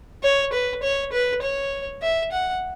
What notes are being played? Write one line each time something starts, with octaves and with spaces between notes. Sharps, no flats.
C#5
B4
C#5
B4
C#5
E5
F#5